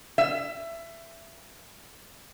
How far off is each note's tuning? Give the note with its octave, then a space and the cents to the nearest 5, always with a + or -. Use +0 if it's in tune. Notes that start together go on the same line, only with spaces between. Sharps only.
E5 +20